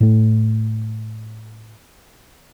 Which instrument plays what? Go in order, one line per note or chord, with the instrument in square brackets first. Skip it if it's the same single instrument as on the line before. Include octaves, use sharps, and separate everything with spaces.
[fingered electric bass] A2 A3